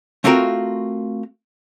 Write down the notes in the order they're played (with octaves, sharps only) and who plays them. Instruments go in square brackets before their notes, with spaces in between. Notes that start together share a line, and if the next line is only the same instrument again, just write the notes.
[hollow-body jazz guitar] A3 C4 F4 F#4 A#4 G5